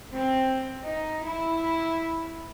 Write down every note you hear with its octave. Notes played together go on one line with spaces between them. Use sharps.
C4
D#4
E4